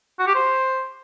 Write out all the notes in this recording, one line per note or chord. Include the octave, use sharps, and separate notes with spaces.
F#4
G4
C5